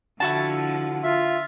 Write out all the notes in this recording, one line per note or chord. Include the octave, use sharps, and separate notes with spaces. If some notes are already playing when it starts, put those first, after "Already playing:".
D3 F3 E4 F#4 A5
F4 E5